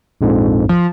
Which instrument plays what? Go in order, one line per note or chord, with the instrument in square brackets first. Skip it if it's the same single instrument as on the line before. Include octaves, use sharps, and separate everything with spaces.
[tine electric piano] A#1 F2 G#2
[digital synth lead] F3